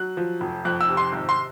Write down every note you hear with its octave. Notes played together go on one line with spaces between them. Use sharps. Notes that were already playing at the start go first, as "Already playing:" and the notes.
Already playing: F#3 F#6
F3
F1
F2 F#6
E6
C3
C6
G#1
C6